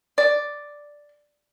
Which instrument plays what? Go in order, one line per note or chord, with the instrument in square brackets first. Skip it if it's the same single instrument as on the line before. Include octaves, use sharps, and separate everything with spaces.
[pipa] D5